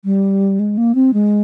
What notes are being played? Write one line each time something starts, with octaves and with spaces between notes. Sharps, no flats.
G3
G#3
A#3
C4
G#3